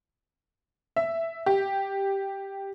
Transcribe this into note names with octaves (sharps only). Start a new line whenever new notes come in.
E5
G4